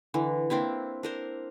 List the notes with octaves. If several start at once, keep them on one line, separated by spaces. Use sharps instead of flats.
D3 E3
A#3 C4 D4 E4
D4 A#4 C5